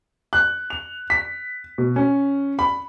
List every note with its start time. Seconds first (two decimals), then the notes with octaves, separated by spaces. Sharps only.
0.33 F#6
0.70 F7
1.10 B6
1.78 B2
1.96 C#4
2.59 B5